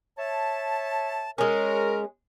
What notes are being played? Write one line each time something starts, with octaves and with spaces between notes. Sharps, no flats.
C#5 E5 A5
G#3 C#4 A#4